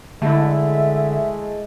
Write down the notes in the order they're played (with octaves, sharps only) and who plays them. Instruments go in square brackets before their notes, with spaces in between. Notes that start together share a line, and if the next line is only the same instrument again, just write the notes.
[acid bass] D3 [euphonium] G#3 [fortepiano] A3 E4 [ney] E5